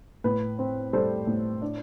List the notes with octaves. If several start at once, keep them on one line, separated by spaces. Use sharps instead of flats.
A2 B4
C4
G3 A4 C5
A2
D4